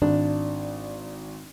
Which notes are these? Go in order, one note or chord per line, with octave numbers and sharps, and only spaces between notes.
G#1 D4